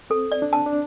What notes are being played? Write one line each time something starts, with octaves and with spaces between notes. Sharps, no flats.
C4 A4
D5
D4
A5
D4